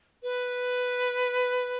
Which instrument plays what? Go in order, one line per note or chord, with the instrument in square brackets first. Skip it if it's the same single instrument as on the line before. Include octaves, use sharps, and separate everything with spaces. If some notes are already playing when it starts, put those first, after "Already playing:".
[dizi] B4